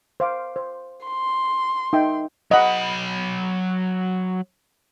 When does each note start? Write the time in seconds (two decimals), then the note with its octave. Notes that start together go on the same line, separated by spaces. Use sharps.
0.20 C5 F5 D6
0.56 C5
1.06 C6
1.93 D#4 E5 G5
2.51 F#3 D#5 F#5 B5